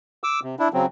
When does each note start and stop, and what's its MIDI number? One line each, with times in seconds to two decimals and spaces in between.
0.24 0.40 86
0.24 0.40 88
0.43 0.55 48
0.59 0.68 62
0.59 0.68 64
0.74 0.86 49
0.74 0.86 54
0.74 0.86 60